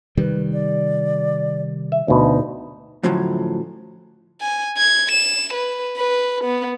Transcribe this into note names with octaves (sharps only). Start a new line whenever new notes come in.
C3 D#3 G3 B4
D5
E5
D2 B2 D#4
F#2 A2 D3 F3 F#3
G#5
G#6
E7
B4
B4
B3